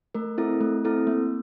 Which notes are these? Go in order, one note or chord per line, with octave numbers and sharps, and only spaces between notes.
A3 A#4
C4 E4 A4
A3
C4 E4 A4
A#3